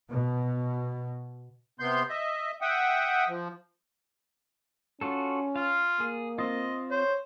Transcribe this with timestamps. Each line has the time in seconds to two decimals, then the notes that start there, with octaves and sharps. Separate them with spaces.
0.10 B2
1.80 C3 B3 C6 G6
2.09 D#5 E5
2.62 E5 F#5 G5 D#6
3.28 F3
5.01 C#4 F4 F#4 A4
5.56 F4 F5
6.00 A#3 G#4
6.38 C4 F4 D#5
6.91 C5 C#5